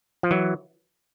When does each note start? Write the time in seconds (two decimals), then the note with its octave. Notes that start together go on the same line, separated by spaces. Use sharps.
0.23 F3
0.31 E3 F#3